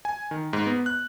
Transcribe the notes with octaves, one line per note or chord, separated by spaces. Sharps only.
G#5
D#3
G#2
B3
F#6